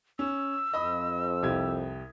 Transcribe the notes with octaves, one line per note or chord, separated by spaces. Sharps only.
C#4 E6
F2 D#5 B5 D#6
C2 G4 G#6